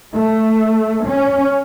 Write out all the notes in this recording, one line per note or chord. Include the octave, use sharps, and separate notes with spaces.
A3
C#4